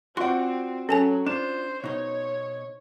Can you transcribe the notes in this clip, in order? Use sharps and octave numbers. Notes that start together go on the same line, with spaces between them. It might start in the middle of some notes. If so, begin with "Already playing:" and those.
C4 F4 F#4 D5 F#5 C6
F#3 C#4 A4 G#5 A5
D4 F4 C5 E7
B2 D#4 C#5